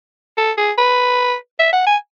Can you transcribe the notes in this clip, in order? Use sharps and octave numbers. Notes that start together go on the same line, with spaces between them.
A4
G#4
B4
E5
F#5
G#5